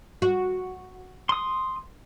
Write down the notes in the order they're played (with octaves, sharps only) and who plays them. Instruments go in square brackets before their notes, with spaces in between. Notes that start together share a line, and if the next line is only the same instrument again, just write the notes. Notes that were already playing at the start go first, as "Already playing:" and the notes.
[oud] F#4
[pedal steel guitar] C6 D#6